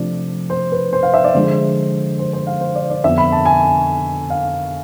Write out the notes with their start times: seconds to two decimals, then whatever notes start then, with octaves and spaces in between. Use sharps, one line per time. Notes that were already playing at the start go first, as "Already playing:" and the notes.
Already playing: C3 F3 A3 D4 D5
0.50 C5
0.72 B4
0.93 C5
1.03 F5
1.14 E5
1.24 D5
1.34 D3 F3 G#3 D4 C5
2.19 C5
2.33 C5
2.47 F5
2.61 C5
2.75 D5
2.90 D5
3.03 F2 D3 F3 B3 E5
3.18 B5
3.32 A5
3.45 G#5
4.30 F5